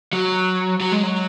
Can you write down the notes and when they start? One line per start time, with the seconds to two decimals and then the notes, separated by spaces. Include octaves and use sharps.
0.13 F#3
0.81 F#3
0.92 G#3
1.03 F#3